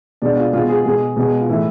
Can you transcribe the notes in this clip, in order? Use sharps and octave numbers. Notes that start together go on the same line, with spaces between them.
B2 G#3 D4
F4
B2 G#3 F4
G#4
B2 G#3 G#4
B2 G#3
F4
A2 E3 G#3 E4